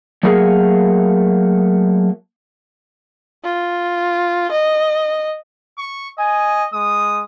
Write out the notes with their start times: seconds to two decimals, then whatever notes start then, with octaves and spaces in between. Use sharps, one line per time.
0.23 F#3 A3 A#3 F#4 G#4 A#4
3.45 F4
4.52 D#5
5.78 C#6
6.19 D#5 G#5
6.74 G#3 D#6